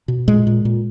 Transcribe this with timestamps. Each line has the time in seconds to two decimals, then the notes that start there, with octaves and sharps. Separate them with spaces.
0.08 B2
0.28 A#2 G#3
0.47 A#2
0.65 A#2